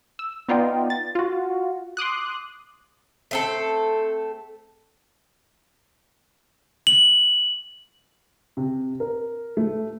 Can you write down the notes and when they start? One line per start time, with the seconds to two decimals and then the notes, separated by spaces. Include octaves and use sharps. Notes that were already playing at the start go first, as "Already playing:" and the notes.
0.19 E6
0.49 B3 D#4 F4 D5 G5
0.90 A6
1.15 F4 F#4
1.97 C6 D6 D#6 F#6
3.31 A3 C4 A4
6.87 F#7
8.57 C3
9.00 A#4
9.57 A3